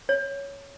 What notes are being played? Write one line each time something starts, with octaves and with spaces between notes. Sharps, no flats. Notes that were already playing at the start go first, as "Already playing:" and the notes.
C#5